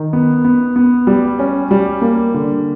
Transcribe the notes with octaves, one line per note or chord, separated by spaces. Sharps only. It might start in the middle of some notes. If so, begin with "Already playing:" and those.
Already playing: D#3
B3
B3
B3
G3
C#4
G3
A#3
D3